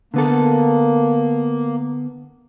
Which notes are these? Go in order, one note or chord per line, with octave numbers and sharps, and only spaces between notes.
D3 A#3 B3 A4